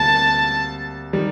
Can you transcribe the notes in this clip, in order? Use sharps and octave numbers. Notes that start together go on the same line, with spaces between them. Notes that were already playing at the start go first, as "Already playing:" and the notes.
Already playing: D2 C3 G3 A#3 A5
D#3 G3